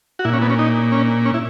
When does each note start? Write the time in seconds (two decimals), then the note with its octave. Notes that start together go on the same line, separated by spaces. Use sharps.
0.19 F#4
0.25 A#2 E4
0.33 C#4
0.42 B3
0.50 C#4
0.59 D#4
0.92 C#4
1.26 C#4
1.34 E4